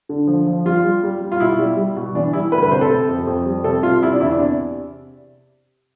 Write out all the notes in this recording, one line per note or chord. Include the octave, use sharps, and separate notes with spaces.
D3
F3
F3
G3 F4
G3
G3
G3
F4
B2 E4
G3
G3
B2
E3 D4
G3 E4
D2 B4
B4
C3 C5
A4
C3
F2
F2
G3
C3 A4
C3 F4
C3 E4
D4
E2 E4
D4
C3